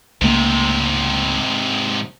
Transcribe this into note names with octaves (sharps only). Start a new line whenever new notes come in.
C#2 G#2 C3 A3 A#3